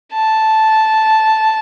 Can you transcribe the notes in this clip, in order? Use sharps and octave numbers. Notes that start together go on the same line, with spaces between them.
A5